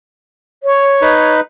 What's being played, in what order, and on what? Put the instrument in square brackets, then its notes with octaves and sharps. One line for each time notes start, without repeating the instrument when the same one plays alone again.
[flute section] C#5
[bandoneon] D#4 B4